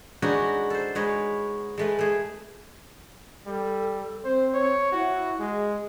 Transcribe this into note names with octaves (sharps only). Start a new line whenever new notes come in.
G#3 D4 D#4 F#4 B4 C#5
A4 C5
G#3 D#4 B4 C#5
G#3 A3 B4
A3 G#4
G3 A4
C4 C5
C#5
E4 F#4
G#3 G#4